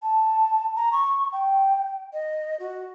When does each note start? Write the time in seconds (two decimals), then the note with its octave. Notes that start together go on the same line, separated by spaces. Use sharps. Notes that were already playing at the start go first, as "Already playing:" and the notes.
0.03 A5
0.76 A#5
0.92 C#6
1.32 G5
2.13 D#5
2.60 F#4